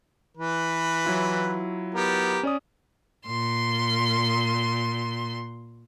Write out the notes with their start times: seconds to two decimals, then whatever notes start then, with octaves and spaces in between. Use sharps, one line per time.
0.37 E3 B4
1.05 F#3 E4 F4
1.95 B3 G4 A#4
2.43 C#4 D5 D#6
3.26 A#2 C6